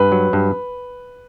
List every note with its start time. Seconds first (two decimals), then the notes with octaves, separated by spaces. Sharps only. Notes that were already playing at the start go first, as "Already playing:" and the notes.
Already playing: G2 B4
0.12 F#3
0.33 G2